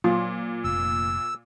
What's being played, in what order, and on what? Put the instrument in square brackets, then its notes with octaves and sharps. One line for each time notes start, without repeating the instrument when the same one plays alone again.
[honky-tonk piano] A#2 [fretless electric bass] F#3 [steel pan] F4
[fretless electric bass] F1 [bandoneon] E6